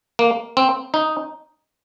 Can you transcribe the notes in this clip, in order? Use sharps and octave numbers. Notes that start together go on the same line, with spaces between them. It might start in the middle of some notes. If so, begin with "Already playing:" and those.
A#3
C4
D#4